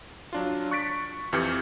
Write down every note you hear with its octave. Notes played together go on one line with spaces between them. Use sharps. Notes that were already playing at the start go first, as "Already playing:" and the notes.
F#3 D4 F4
C#6 F#6 A6 B6 D7
F2 E3 G4 F6 G6 C#7